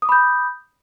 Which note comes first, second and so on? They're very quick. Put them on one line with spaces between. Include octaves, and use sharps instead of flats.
D#6 D6 B5 G6